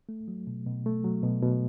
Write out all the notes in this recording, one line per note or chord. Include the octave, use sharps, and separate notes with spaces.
A3
F#3
B2
B2
A3
F#3
B2
B2